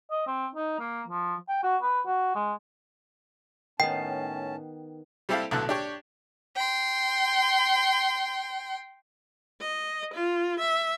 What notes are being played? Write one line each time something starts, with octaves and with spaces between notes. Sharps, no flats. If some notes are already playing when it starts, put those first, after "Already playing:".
D#5
C4
D#4
A#3
F3
G5
F#4
B4
F#4
G#3
A2 D#3 B3 C#4 G5 A5
G3 C4 E4 G4 A4 F5
B1 A2 D3 A4 F#6
D4 G4 C#5
G5 C6
D#5
F4
E5